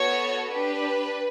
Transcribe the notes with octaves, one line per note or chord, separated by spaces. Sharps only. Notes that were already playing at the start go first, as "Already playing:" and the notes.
Already playing: B3 F#4 A4 C#5
D4 G4 B4